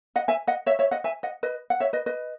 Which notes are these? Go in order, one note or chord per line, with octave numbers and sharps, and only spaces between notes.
D#5 F#5
E5 G#5
D#5 F#5
C#5 E5
C#5 E5
D#5 F#5
E5 G#5
D#5 F#5
B4 D#5
F#5
C#5 E5
B4 D#5
B4 D#5